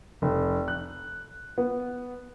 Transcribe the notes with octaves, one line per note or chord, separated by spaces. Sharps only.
F1
F#6
B3